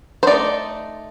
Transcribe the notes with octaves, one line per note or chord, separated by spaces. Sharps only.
C5
A3 D#4 D5